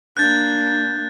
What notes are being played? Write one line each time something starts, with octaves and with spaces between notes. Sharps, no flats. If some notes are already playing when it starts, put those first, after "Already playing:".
A#3 D4 F#6 G6 A6